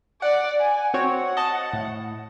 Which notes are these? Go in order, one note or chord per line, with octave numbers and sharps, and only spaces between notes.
D5 F#5
G#5
C4 F#4 C#5 F#5
D#5 A5
A2